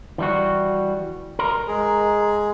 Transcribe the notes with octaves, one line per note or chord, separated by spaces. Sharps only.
E3 G3 F#4
A#4
G#3 G#4